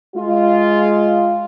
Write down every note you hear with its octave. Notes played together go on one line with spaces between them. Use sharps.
G#3 F4